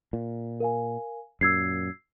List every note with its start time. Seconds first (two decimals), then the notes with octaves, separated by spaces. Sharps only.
0.13 A#2
0.60 A#4 F5 G#5
1.41 F#2 A#2 E6 G#6 C7